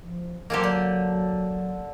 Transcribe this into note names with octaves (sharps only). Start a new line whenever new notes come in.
F3
F3 F#3 A#3 G4 A4 G#5
D3